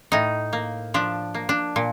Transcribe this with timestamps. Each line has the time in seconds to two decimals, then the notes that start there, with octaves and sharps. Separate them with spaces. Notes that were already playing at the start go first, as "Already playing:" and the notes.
0.12 A2 D#4
0.53 A#3
0.94 F3 D4
1.34 A#3
1.49 D4
1.76 A#2